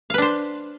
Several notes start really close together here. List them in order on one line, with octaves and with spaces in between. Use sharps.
F5 B4 D4 C5